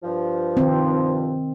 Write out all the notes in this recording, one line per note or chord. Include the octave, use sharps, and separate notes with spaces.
G2 F3
D#3 C4